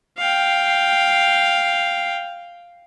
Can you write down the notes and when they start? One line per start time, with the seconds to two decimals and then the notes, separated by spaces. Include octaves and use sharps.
0.18 F5 G5